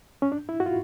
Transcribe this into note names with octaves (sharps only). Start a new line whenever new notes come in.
C#4
D4
E4
F#4
F4